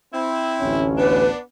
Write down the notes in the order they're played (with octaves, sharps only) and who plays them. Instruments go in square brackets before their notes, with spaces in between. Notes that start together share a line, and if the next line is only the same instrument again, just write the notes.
[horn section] C4 E4
[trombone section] A1 D2 C#4
[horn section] B3 D4 [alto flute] B4